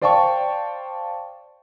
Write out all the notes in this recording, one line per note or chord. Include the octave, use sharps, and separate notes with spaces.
C5 D5 F5 G5 A5 C#6